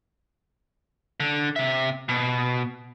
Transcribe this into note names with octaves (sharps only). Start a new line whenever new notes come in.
D3
C3 E5
B2